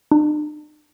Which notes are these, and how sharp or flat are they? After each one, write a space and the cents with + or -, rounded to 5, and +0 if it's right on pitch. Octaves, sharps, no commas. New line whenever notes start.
D4 +45